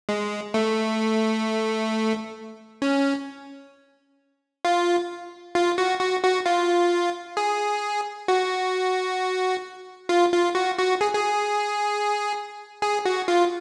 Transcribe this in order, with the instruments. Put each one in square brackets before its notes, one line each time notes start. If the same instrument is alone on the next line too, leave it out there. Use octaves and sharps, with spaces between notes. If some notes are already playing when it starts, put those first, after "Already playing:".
[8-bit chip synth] G#3
A3
C#4
F4
F4
F#4
F#4
F#4
F4
G#4
F#4
F4
F4
F#4
F#4
G#4
G#4
G#4
F#4
F4